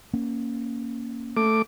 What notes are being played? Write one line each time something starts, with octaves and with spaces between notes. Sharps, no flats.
A#3 C#4
A3 D6